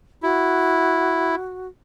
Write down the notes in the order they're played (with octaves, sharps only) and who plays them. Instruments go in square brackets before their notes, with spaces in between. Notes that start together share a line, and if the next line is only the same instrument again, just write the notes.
[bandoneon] E4 [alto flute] F#4